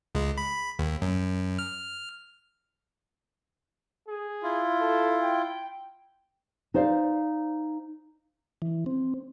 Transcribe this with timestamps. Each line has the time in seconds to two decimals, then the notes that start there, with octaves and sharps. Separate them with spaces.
0.15 C#2 G#3
0.38 B5
0.79 D#2
1.02 F#2
1.59 F6
4.08 G#4
4.43 E4 F4
4.80 A4
5.22 G5
6.74 D#4 C5 D5 F5
8.62 E3
8.86 C4